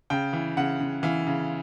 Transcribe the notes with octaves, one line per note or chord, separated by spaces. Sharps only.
C#3 G5
E3
C#3 F#5
C#3
E3 F5
C#3